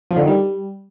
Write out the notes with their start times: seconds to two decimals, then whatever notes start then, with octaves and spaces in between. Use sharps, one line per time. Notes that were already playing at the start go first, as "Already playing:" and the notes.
0.11 F3
0.16 D3
0.22 D#3
0.28 G3